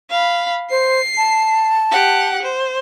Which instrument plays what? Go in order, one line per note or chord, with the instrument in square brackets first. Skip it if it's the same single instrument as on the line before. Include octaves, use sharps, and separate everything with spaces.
[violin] F5 B5
[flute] C5 [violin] C7
[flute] A5
[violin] G4 F#5
C5